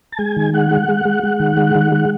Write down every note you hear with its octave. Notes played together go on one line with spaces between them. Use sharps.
A5
G#3 G#5
D#3
G#3 F#5
G#3
G#3
G#3
G#3
D#3
G#3
D#3
G#3